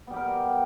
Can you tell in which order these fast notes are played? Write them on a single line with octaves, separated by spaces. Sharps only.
B3 G3 G4 A#4